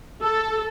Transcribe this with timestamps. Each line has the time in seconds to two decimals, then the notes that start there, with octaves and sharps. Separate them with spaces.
0.22 A4